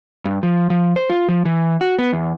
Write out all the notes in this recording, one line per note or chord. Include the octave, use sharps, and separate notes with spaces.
G2
F3
F3
C5
F4
F3
E3
F#4
B3
E2